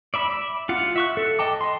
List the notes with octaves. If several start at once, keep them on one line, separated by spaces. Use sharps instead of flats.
D5 E5 B5
F4 F#5
E5 C#6 F#6
A4
D#5 G5 A5 D6
D#5 C6